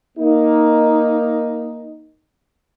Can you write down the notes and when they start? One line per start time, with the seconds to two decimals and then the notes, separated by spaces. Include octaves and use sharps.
0.18 A#3 D#4